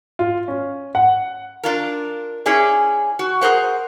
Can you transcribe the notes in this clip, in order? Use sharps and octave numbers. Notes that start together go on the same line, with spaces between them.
F4
C#4
F#5
D4 F4 A#4
C#4 E4 G#4 D5
F#4
G#4 A#4 C5 F#5